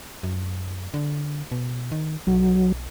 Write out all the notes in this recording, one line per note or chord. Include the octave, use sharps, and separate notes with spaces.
F#2
D3
B2
D#3
B1 F#3